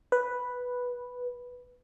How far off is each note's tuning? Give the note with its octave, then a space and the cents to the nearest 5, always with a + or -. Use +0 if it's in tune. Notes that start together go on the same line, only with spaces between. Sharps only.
B4 -5